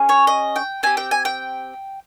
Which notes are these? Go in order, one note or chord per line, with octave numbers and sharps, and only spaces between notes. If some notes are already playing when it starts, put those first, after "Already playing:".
Already playing: C#4 G#4
C#5
D#5
G5
C4 G4 G#5
G5
G#5
G5